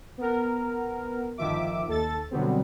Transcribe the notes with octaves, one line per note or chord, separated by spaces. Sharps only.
B3 A#4
G1 D#3 F3 E5 D6
D#2 A4 A6
B2 D3 F#3 G3 B3 C4